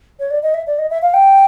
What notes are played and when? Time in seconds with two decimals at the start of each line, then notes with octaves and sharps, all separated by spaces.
0.19 C#5
0.30 D5
0.42 D#5
0.54 E5
0.67 D5
0.78 D#5
0.90 E5
1.02 F5
1.14 G5